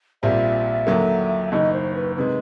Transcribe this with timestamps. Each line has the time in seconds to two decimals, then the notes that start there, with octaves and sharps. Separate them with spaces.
0.23 A#1 A#2 G3 C4 E5
0.87 D#2 D3 F#3 A#3
1.52 F#1 F#2 D#3 D#5
1.73 C5
1.95 B4
2.16 C3 D#3 G#3 B4